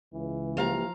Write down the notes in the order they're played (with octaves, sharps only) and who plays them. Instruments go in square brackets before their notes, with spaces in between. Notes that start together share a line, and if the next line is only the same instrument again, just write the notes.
[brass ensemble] C#2 [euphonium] E3
[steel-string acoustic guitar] F3 F5 A#5 [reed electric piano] A#3 G4